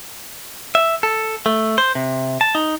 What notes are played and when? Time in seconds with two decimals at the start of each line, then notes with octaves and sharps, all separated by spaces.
0.75 E5
1.03 A4
1.46 A3
1.78 C5
1.95 C3
2.41 A5
2.55 D#4